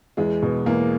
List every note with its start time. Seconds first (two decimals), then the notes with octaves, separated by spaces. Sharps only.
0.17 E2 G#3
0.43 B2
0.66 E2 A#3